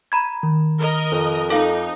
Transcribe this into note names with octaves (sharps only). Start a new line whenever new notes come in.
A#5 B5 G#6
D#3
A#4 D#5
F2
D#4 A4 F5